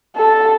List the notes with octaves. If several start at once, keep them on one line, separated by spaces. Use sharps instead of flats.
A4